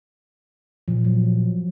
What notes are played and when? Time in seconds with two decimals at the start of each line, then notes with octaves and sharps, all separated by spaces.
0.88 A#2 F3
1.05 F#3